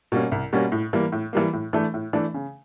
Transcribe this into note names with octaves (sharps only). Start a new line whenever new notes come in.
B2 G3 A#3 C#4
C2
B2 G3 A#3 C#4
A2
E3 G3 A#3
A2
E3 G3 A#3
A2
E3 A3 D4
A2
E3 A3 D4
C#3